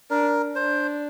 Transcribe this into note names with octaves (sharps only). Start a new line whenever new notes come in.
D4 A#4
D4 C5